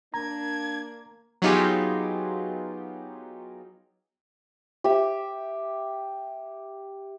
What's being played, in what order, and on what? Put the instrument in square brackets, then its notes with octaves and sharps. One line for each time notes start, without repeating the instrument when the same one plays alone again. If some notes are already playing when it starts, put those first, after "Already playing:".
[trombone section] A#3 [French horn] D4 [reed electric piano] A#5 [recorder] G#6
[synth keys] F#3 B3 D#4 F4 G4 G#4
[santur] G4 E5